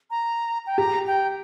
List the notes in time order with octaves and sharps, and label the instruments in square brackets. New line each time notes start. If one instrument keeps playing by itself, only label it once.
[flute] A#5
G5
[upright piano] G4 [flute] A#5
[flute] G5